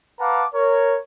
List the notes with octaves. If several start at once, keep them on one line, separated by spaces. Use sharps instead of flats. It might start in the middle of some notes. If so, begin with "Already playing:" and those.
B4 F5 F#5 A5 A#5 D6
A#4 C#5